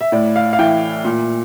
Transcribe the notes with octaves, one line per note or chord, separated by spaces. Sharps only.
E5
A2 D5
F5
F5
E3 G5
A#2